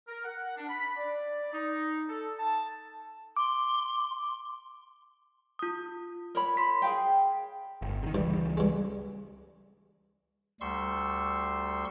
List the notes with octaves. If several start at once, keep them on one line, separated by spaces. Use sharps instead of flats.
A#4
F#5
D4
B5
D5
D#4
A4
A5
C6 D6
F4 D#6
A#4 C#5 B5
C6 B6
G#4 F5 G5
G1
C3 D#3
C#2 G2 E3 G3
G2 G#3
D2 G3 C6 C#6 E6